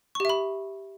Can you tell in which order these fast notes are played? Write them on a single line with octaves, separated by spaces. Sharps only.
C#6 G4 E5 B5